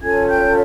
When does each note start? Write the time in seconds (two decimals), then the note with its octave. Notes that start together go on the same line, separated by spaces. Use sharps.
0.01 C#4 F4 A4 C#5 G#5 G#6
0.28 G5 G6